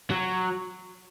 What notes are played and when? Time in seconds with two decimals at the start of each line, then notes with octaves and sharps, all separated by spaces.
0.11 F#3